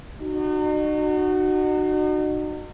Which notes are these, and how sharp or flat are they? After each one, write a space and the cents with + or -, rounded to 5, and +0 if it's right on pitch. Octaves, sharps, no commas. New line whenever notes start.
D#4 -40 F#4 +0